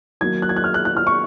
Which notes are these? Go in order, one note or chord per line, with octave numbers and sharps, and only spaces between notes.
D#3 F#3 A#3 D#4 G#6
F#6
G#6
F#6
F6
F#6
F#6
F6
C#6